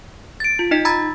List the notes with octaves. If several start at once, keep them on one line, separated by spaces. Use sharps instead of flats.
A6 D7
F4
D#4 D#5 B6
A#5 B5 E6 G#6 A6